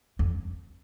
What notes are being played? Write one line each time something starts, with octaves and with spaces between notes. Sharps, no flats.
F2